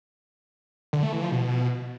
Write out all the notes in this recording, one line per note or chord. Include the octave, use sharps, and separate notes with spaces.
D3
A3
E3
F3
B2